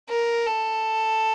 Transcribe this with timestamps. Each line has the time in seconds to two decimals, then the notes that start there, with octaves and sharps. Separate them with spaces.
0.10 A#4
0.46 A4